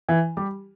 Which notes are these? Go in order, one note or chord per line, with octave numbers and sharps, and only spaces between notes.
E3 E4
G3 G4